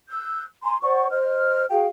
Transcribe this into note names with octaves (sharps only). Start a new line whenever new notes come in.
E6 F#6 G6
G#5 A#5 C6
C5 D5 F#5 C#6
C5 D#5 F6
F#4 G#4 F5 G5